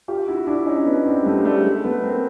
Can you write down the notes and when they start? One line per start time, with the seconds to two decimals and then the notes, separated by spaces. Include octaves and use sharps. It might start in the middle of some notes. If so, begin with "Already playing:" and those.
0.08 F4 G4
0.27 E4 F#4
0.47 D4 E4
0.66 C#4 D#4
0.86 B3 C#4
1.06 C4 D4
1.21 G#3
1.26 G3 A3
1.38 G#3
1.45 G3 A3
1.65 G#3
1.84 A3 B3
2.03 A#3 C4